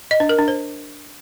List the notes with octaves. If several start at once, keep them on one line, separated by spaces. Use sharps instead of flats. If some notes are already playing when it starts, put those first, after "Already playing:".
D#5
D4
A#4
D4
C5